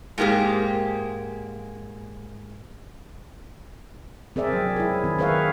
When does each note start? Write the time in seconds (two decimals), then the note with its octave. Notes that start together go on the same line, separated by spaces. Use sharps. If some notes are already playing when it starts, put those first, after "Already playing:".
0.18 G#2 G#3 A#3 G4 G#4
4.36 C4 G#4 A#4 D5 E5
4.53 F#3
4.76 E4 G#4
5.04 D#3 C4
5.19 G#4 A#4 B4 C#5 E5 F5